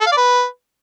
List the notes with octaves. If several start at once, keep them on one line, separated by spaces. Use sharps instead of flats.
A4
F5
D5
B4